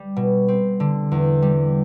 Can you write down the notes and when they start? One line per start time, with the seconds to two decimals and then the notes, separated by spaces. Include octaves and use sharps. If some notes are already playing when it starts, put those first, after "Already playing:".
Already playing: G3
0.16 B2
0.48 C4
0.80 D3
1.12 E2
1.42 G3